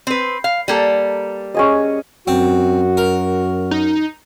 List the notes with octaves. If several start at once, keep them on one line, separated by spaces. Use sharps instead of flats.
C4 B4
F5
G3 A#3 A4
C#4 G#4 D#5
F#2 C4 F#4
A#4
D#4